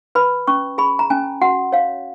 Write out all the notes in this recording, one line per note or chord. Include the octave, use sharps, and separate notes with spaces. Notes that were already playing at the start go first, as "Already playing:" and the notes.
B4 B5
C#4 C#6
G#4 B5
A#5
C#4 G#5
F#4 F#5
C#5 F5